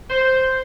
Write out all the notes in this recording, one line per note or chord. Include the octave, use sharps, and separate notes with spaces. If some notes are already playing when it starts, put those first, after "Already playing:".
C5